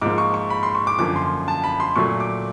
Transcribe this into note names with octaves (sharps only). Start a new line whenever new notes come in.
G#2 F3 A#3 D6
C#6
C#6
B5
C6
C#6
D6
F#2 D3 F3 A#3 D6
C6
A5
B5
C6
A#2 F#3 A3 C#6
D6